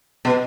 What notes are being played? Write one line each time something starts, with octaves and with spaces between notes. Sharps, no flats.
B2